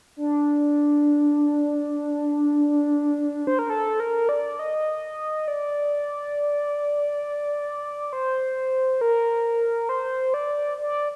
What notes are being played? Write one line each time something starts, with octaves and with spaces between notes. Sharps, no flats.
D4
C5
A#4
A4
A#4
D5
D#5
D5
C5
A#4
C5
D5
D5